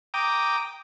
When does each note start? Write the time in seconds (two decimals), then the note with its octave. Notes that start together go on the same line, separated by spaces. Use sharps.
0.14 G5 A#5 D6 D#6